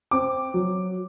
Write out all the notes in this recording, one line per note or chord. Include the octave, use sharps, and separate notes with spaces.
C4 D6
F#3